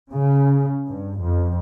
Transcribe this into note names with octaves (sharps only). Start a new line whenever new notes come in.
C#3
G2
F2